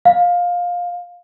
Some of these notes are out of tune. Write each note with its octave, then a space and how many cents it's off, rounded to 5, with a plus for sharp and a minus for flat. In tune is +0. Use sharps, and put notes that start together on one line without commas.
F5 +15